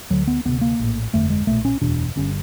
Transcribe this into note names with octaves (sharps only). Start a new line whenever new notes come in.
D2 D3 F#3
B3
D2 C3 B3
A#3
A#1 A2
G1 F2 D3 A3
G#3
B1 A#2 A3
C#4
F#1 E2 B2 D4
G1 G2 D3 C#4